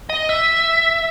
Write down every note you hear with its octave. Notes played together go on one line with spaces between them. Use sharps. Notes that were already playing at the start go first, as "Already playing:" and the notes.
D#5
E5